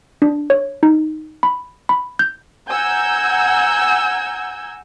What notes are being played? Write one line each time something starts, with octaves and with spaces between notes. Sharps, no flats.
D4
C#5
D#4
B5
B5
G6
F#5 G#5 A#5 E6 G6 G#6